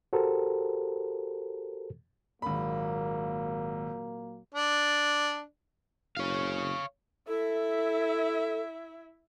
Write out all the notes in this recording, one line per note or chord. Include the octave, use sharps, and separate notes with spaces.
F#4 G4 A4 A#4 C5
G#1 A#2 F#3 A#3 B5
D4
F#1 C#5 F5
E4 A4 E5